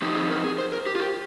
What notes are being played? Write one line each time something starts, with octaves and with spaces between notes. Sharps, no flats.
F3 C4 D#4 G4
G#4
A#4
G#4
C5
A#4
G4
F4
G4